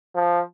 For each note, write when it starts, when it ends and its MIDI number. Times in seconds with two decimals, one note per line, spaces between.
0.15 0.40 53